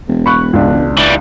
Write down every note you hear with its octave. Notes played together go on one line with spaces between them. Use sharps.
E1
B5 C#6 F#6
C#2 D4
E3 G3